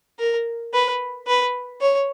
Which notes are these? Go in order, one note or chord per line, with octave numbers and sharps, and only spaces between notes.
A#4
B4
B4
C#5